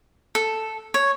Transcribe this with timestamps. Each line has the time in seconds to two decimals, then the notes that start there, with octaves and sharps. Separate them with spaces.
0.35 A4
0.94 C#5